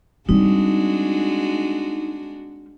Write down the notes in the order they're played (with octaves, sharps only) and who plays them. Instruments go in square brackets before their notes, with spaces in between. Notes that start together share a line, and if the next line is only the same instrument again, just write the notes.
[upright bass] G3 C4 [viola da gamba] G#3 D4 F#4 [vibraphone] D#4